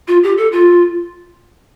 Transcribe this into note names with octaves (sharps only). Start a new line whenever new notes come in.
F4
G4
A4
F4